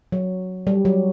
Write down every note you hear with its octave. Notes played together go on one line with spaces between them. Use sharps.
F#3
G3
F#3